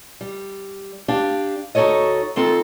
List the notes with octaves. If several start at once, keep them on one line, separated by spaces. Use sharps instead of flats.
G3
D4 G4 F5
D2 D#4 F#4 A4 C#5 D#5
D#3 C4 F4 A4